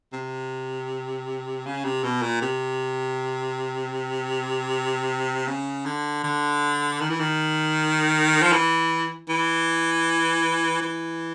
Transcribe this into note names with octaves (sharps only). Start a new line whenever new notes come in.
C3
C#3
C3
B2
A#2
C3
C#3
D3
D3
D#3
E3
D#3
F3
E3
E3
E3